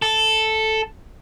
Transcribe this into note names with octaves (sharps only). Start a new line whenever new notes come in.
A4